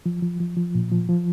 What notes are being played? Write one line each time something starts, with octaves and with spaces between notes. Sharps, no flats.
F3
F3
F3
F3
A#2
F3
F3